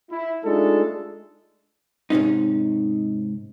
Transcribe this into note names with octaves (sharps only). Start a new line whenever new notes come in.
E4
G#3 A3 D4 D#4 F4 A4
G#2 C3 C#4 D#4